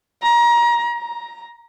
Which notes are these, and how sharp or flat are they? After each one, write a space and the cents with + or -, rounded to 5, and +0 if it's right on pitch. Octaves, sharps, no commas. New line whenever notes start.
A#5 +30
A#5 +5